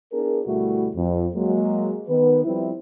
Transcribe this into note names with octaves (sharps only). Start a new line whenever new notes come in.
B3 D4 E4 G#4 A#4
D2 B2 G3 A3 E4 F#4
F2
F#3 G#3 A#3
D#3 B3 B4
F3 G3 C4 E4